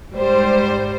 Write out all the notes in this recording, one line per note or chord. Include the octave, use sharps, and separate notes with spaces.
G#2 G3 C5